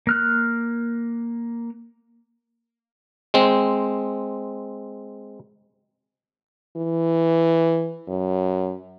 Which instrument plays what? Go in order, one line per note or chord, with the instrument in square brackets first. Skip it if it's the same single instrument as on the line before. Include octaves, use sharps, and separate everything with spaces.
[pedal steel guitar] A#3 F6 F#6
[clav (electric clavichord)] G#3 C4
[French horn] E3
F#2